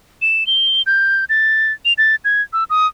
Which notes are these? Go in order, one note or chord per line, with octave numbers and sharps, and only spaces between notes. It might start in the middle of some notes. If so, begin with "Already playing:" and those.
E7
G7
G6
A6
F7
A6
G#6
E6
D#6